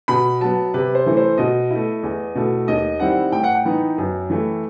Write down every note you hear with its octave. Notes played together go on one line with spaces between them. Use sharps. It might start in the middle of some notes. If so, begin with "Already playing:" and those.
B2 B5
F#3 B3 A5
C3 B4
C5
E3 A3 E4
C5
B2 D#5
A3 E4
E2
B2 A3 E4
D#2 D#5
D#3 G3 C4 E4 F#5
A2 G5
F#5
G5
E3 B3 D#4
F#2
E3 A3 E4